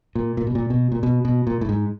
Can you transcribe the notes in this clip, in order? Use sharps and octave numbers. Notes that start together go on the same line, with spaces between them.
A#2
A#2
B2
A#2
B2
A#2
B2
B2
A#2
A2
G#2